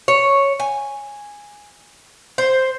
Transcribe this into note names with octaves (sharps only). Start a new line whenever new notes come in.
C#5
G#5
C5